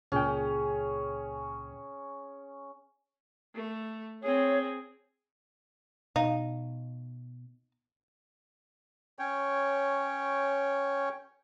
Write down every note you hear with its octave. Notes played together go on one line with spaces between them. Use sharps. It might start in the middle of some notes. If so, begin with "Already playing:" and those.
C#2 A#2 C#4 G#4 G5
A3
C4 G#4 C#5
B2 D#4 F5
C#4 C#5 G5